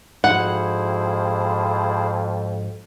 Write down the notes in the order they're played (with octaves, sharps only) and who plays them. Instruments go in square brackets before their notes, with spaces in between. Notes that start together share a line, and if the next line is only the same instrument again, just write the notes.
[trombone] F2 [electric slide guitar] G#2 F3 F#4 [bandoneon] E4 G#4 C5 [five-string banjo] F#5